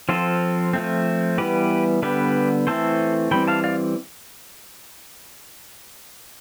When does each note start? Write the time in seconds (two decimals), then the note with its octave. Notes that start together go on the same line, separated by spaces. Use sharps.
0.09 F3 C4 F4 A4
0.73 F3 A3 C4
1.38 E3 G3 B3 G4 B4
2.02 D3 G3 B3 G4 B4
2.67 E3 A3 C4 A4 C5
3.31 E3 G3 C4 G5 B5
3.47 F5 A5
3.64 D5 F5